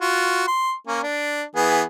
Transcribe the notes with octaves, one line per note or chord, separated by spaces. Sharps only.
F4 F#4
C6
A#3 C#4
D4
E3 B3 G#4